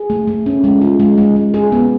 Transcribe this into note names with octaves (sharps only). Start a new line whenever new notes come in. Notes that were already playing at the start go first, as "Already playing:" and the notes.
Already playing: G#4
A3
A3
C#4
G#3
F4
G#3
G#3
G#3
G#4
B3